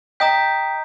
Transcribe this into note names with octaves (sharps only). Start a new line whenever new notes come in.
D#5 G5 A#5 D#6 G6 B6